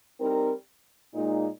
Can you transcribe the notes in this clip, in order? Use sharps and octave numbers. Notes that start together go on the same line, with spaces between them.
G3 C4 D#4 A#4
A#2 G#3 D#4